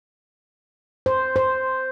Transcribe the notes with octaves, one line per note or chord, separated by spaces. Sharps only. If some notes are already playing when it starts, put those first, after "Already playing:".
C5
C5